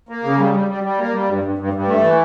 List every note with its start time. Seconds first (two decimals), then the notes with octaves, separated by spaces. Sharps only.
0.09 A#3
0.24 C#3
0.39 G3
0.54 G3
0.68 G3
0.84 G3
0.99 A#3
1.14 G3
1.28 G2
1.43 G2
1.58 G2
1.73 G2
1.88 A3
2.03 E3